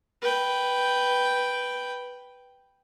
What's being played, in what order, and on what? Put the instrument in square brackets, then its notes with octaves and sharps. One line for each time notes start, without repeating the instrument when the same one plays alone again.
[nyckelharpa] B4 G5